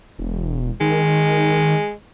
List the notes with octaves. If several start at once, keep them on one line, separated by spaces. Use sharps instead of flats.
E1
D#3 G#3